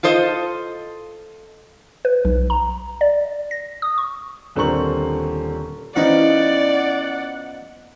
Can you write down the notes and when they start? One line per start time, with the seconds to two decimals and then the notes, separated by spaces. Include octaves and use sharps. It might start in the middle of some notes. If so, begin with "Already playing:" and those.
0.03 F4 A4 C5 D#5
2.05 B4
2.25 B1
2.50 A#5
3.01 D5
3.51 A#6
3.82 D#6
3.98 C#6
4.55 D#1 D3 C4 A#4 C#6 F#7
5.96 E3 F3 B3 C#4 D#4 D5 F#5